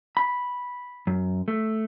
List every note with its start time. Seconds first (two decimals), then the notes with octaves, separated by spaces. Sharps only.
0.17 B5
1.07 F#2
1.48 A3